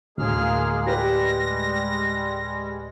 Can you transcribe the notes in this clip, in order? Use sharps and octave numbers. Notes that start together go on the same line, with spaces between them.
D2 A2 G#3 A#3 G#4 F6
G3 G#3 G4 B4 A#6